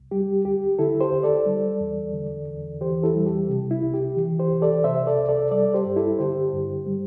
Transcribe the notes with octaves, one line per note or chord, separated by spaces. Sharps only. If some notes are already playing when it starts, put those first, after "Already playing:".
Already playing: C2
G3 G4
D2 G4
D3 E4 A4
G4 C5
D2
A4 D5
G3
E2
D3
E2
E3 G4 C5
E4 A4
G3
G4
C3
E4
C2
G4
E3
G4 C5
C2
A4 D5
C3 C5 E5
A4 D5
C2
A4 D5
G3 A4 D5
G4 C5
G2
E4 A4
D3 G4 C5
G2
G3